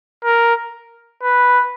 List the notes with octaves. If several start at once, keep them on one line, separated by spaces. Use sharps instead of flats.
A#4
B4